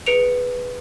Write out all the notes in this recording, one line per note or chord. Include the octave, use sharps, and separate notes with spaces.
G#4 B4 C#7 D7 F7